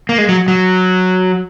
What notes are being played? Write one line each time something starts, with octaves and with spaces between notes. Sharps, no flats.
A#3
G#3
F#3
F#3